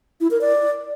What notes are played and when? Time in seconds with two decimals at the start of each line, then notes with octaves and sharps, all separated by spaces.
0.21 E4
0.31 A#4
0.41 D5